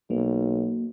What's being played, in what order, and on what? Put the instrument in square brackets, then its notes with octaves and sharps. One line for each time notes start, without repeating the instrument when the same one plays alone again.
[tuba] B1 [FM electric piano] A#3